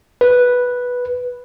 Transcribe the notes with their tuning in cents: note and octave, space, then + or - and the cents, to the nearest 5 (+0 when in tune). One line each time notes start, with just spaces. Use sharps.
B4 -5